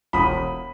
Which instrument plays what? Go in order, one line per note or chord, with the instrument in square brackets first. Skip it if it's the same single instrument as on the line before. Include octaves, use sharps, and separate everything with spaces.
[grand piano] E1 B5 D#6